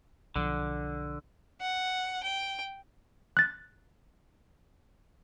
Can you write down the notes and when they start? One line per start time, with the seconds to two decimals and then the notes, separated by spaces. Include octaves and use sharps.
0.36 B1 D3 F3
1.61 F#5
2.23 G5
3.37 F#6 A6